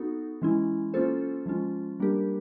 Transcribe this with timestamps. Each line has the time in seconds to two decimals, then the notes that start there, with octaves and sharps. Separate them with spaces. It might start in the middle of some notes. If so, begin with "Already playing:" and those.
Already playing: B3 D#4 F#4 A4
0.42 E3 G#3 C#4 E4
0.94 A#3 C#4 F4 A4 C5
1.46 F3 G#3 C#4 F4
2.00 G3 A#3 D4 G4 A#4